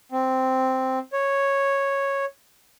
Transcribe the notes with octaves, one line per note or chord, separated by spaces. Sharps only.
C4
C#5